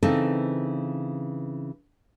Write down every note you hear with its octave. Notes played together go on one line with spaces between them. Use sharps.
C#3 E3 C4 D#4 A4